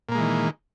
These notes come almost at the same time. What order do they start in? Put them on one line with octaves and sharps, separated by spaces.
A#2 A#3 G#3 E3 D#3